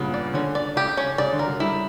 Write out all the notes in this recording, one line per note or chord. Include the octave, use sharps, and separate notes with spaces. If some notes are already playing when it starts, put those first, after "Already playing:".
Already playing: G2 A#2 C#3 B3
D5
D3 C#4
D5
C#3 G4
C#4
C#3 D5
D3
A#4
F#3
G3 E4